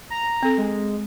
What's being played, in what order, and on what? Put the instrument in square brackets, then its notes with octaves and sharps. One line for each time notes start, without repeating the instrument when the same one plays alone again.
[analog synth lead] A#5
[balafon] C4 A4
[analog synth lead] G#3